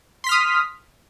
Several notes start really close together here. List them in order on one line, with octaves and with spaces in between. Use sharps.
C6 B6 F6 D#6